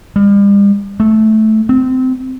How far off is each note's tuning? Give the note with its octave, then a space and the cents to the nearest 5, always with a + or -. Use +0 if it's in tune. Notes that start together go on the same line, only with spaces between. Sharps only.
G3 +40
A3 -15
C4 -20